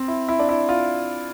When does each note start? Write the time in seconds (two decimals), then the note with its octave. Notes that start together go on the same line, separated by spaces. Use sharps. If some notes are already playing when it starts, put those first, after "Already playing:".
Already playing: C4
0.08 E4
0.29 E4
0.39 D4
0.49 E4
0.69 F4